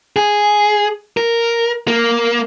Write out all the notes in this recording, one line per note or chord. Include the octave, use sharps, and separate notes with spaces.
G#4
A#4
A#3